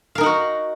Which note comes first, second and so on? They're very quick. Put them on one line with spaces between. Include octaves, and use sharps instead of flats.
F5 A#4 D#4 F#5 F#4